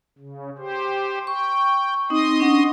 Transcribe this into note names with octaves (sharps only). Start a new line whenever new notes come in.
C#3
G4 C5
G5 C#6
C4 D#4 D#5 C6 D#6
C#4 D4 F#5